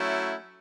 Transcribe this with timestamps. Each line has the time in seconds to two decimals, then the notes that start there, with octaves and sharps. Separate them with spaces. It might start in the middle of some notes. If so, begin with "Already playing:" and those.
Already playing: F#3 A3 C#4 E4